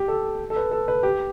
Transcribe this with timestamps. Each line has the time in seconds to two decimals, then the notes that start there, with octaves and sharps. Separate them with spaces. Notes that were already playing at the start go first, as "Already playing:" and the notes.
Already playing: G4
0.08 A4
0.50 A4
0.56 B4
0.71 A4
0.88 B4
1.03 G4